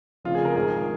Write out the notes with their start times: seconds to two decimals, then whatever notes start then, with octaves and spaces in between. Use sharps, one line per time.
0.24 F1 F2 C#3 F4
0.35 G#4
0.45 A#4
0.55 A#1 G#2 D#3 G#4